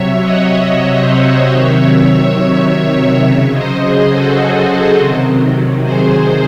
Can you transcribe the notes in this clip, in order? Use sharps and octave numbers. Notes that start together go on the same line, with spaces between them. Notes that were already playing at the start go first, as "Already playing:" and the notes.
Already playing: C3 F#3 C#5 E5
D#5 F#5
C5 D#5
C#5 E5
C3 D#3 F#3
C#3 F#3 C#5 E5
C5 D#5
G#4 C5
F#4 A4
C3 D#3 F#3
G#4 C5